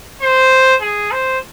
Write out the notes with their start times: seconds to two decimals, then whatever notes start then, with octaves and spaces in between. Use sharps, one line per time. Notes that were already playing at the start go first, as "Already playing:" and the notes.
0.22 C5
0.82 G#4
1.12 C5